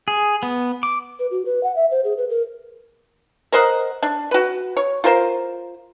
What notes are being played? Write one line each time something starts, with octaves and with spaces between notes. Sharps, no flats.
G#4
B3
D6
B4
F#4
B4
F#5
E5
C5
G#4
B4
A#4
A#4 C5 D#5 F#5
D4
F#4 B4
C#5
F4 A#4 C5